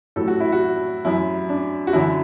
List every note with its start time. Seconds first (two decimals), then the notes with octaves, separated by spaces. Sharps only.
0.16 A2 F#3 A4
0.28 F#4
0.40 E4
0.52 F#4
1.05 F#2 F#3 E4
1.49 D4
1.87 F#4
1.93 F#2 D3 F#3 E4